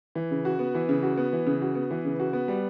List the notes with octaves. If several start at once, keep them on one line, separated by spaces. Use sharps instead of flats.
E3
C#3
F#4
B3
E3
C#3
F#4
B3
E3
C#3
F#4
B3
E3
C#3
F#4
B3
G3